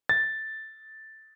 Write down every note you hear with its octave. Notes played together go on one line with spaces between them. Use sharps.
A6